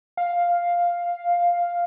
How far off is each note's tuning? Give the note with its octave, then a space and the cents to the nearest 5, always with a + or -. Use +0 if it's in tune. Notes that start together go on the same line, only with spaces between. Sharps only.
F5 +5